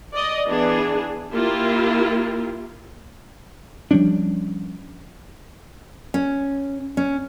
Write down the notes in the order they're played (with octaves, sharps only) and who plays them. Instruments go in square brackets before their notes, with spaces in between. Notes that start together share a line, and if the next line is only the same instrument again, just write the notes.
[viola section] D5 D#5
E3 B3 D4 G#4
A#3 E4 F4 G4 A#4
[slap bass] F3 G3 C#4 D4
[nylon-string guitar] C#4
C#4